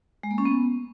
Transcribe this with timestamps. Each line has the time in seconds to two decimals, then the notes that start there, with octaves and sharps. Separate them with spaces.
0.23 G#3
0.31 A#3
0.38 C#4
0.45 B3